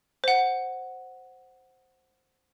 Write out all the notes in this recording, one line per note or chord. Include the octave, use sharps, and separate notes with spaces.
C5 F#5